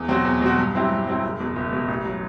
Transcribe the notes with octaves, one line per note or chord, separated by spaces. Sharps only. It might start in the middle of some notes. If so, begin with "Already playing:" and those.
Already playing: E2
B2 F#3 C4 F#4
E2
B2 F#3 C4 F#4
G2
F#3 C4 E4 G4
G2
F#3 C4 E4 G4
F#1
E2 B2
F#1
E2 B2
A1
F#3